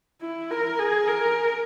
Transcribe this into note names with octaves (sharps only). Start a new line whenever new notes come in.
E4
A#4
G#4
A#4